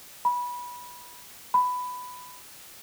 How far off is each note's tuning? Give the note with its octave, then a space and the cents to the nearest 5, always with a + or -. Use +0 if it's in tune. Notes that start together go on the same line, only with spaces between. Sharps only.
B5 -20
B5 +10